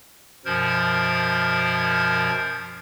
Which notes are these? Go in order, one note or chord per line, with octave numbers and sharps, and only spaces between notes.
F#2 B2 F3 A#4 C5 G#6